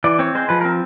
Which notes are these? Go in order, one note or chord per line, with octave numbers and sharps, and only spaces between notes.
E3 D5
C4 C#5
G#3 C5
F3 B4
C4 A#4